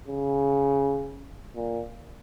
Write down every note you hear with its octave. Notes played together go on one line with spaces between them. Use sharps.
C#3
A#2